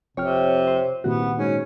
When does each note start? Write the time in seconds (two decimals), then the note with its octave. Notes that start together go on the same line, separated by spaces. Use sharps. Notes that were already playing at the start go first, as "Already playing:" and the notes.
0.17 G1 F2 C3 C#5 G5 F6
0.67 C5 C#5
1.04 C2 A#2 D#3 A#3 B3 F#4
1.38 G#2 C#4